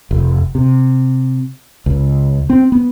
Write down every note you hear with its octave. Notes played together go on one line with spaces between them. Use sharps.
F1
C3
C#2
C4
B3